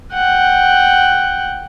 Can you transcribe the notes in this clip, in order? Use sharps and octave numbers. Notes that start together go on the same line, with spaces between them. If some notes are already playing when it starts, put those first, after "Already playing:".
F#5 G5